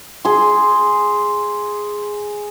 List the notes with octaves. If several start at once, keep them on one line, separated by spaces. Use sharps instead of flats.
G#4 C6